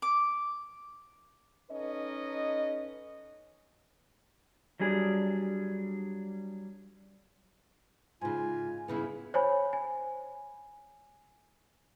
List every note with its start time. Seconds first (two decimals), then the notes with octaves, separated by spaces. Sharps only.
0.02 D6
1.71 C#4 D#4 A4 B4 D#5
4.80 F#3 G3 D4 G#4
8.21 G#2 C#3 F4 G#5
8.88 G2 C#3 B3 E4
9.34 C5 C#5 G#5 B5
9.73 G#5